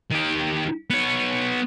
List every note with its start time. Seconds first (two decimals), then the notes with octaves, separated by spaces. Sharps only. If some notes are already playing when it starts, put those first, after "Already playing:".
0.11 D#3 G4
0.90 B3 C#5